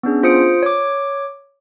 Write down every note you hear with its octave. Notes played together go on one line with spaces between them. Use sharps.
B3 C#4 D4 G#4
F4 C5 D#6 C#7 D7
C#5 D6